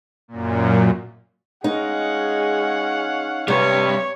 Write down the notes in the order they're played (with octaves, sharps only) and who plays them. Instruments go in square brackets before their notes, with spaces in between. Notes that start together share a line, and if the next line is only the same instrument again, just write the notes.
[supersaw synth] F#2 A#2
[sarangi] G#3 [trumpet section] C#4 F5 F#5 [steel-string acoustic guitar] D#4
[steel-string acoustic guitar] C3 [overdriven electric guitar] G3 B4 [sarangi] C#5